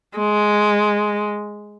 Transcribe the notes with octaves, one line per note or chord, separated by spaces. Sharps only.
G#3